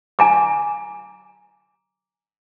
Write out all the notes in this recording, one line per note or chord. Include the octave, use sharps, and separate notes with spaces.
G#5 A#5 D6